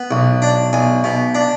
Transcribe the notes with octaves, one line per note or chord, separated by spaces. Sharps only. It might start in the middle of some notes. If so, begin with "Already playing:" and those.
Already playing: B3
B1
D4
B1 G#5
B2
D4